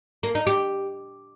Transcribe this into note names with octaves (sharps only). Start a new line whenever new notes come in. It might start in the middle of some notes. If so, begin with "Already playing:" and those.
A#3
D#4
G4